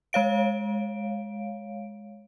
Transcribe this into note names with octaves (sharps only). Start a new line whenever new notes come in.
G#3 C#5 F5 D7